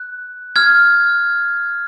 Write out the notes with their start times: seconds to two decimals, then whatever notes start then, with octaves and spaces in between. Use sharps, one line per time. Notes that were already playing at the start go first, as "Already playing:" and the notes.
Already playing: F#6
0.56 F6 G#6